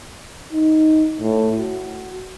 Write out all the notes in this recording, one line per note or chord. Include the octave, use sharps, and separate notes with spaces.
D#4
A2
F#4